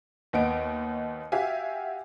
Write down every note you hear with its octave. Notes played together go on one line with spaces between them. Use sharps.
D#2 B3 D#5 D7
F#4 G4 E5 F5 G#5